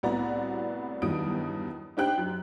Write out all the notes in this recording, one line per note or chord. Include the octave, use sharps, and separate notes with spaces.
C2 A2 B3 F#4 D5 A#5
E2 G2 D#3 F#3 D#6 D7
D4 D#4 G4 C5 G5 F#6
F#2